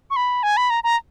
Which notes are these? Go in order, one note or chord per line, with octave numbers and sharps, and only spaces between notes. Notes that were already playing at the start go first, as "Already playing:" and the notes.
C#6
B5
G#5
B5
A#5
A#5